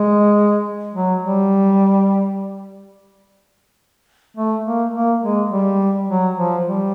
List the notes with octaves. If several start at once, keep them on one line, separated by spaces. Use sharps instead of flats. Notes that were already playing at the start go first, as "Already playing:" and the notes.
Already playing: G#3
F#3
G3
A3
A#3
A#3
G#3
G3
F#3
F3
G3